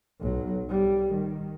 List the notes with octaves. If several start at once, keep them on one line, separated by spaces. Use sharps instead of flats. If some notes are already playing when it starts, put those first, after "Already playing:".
B1 F#3
G3
D#3